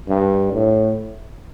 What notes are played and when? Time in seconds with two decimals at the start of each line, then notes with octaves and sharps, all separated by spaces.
0.09 G2
0.53 A2